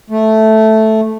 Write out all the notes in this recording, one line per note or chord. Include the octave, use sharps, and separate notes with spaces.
A3